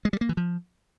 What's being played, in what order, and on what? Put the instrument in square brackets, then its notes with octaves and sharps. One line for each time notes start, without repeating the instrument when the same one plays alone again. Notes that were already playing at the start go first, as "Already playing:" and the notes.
[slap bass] G#3
G3
A#3
E3
F3